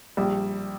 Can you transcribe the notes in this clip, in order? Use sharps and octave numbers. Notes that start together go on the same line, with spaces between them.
A#1 G3